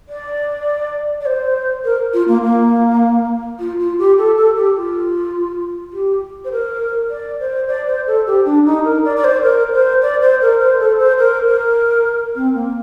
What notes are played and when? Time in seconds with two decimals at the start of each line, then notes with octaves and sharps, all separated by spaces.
0.09 D5
1.21 D5
1.26 C5
1.85 A#4
2.14 F4
2.28 A#3
2.43 A#3
3.59 F4
3.79 F4
3.99 G4
4.18 A4
4.37 A4
4.57 G4
4.77 F4
5.93 G4
6.45 C5
6.52 A#4
7.10 D5
7.40 C5
7.68 D5
7.87 C5
8.07 A4
8.27 G4
8.46 D4
8.66 D#4
8.85 A#4
9.05 D5
9.17 D5
9.24 C5
9.43 A#4
9.73 C5
10.02 D5
10.22 C5
10.42 A#4
10.60 C5
10.80 A4
10.99 C5
11.19 A#4
11.48 A#4
12.36 C4
12.55 A#3